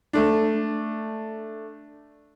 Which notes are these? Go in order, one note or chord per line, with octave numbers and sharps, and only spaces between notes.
A3 D4